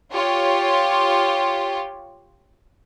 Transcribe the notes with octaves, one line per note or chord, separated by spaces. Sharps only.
F4 G4 C#5